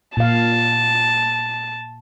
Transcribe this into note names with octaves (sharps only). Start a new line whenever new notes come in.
A#2 F5 A5